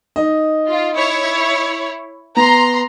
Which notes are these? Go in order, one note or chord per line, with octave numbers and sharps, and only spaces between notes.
D#4 D#5
F4
E4 C#5
B3 A#5 C6